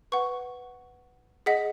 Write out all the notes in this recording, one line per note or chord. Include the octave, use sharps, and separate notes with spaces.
B4 F#5 C#6
G#4 D#5 F#5 B6